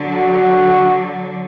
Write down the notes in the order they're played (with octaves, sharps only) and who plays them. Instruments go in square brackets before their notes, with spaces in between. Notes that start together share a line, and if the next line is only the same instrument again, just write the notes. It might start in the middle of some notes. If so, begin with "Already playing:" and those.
Already playing: [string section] D3 F#3
[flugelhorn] F#4